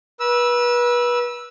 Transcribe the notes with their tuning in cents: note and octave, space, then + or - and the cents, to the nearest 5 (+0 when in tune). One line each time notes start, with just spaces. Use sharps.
B4 -30 E6 +0